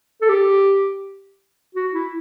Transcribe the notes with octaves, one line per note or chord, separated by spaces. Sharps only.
A4
G4
F#4
E4